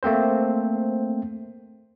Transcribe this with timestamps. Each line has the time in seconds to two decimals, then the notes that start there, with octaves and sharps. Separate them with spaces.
0.03 A3 A#3 C4 C5